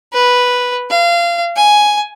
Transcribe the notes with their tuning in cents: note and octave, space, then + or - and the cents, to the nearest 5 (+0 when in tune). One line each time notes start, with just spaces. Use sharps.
B4 -5
F5 -25
G#5 +5